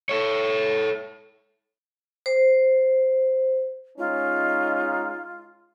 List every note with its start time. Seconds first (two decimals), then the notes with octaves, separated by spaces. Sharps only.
0.09 A4 C#5
2.26 C5
3.98 G#3 C#4 D#4 F4